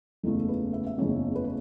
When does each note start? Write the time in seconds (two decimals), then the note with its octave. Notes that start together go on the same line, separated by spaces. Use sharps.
0.23 F#1 E2 C#3 A3 A4
0.39 A4
0.48 B4
0.73 E5
0.87 E5
0.98 F#1 E2 C#3 A3 C#5
1.35 B4
1.44 C#5